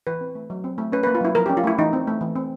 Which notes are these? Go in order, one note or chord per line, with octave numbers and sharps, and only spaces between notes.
E3 B4
C4
A3
F#3
C4
A3
C#4 B4
A#3 B4
F4
F#3 E4
F3 A#4
C#4 G4
F4
A3 E4
E3 D#4
C4
A3
E3
C4